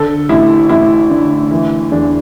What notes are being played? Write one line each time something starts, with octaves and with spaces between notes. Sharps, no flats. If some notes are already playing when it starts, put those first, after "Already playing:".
Already playing: D3 A4
A1 E4
A1 E4
D3
E3 E4
E2 D4